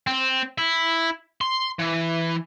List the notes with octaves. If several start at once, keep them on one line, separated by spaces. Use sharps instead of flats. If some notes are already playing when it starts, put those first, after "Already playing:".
C4
E4
C6
E3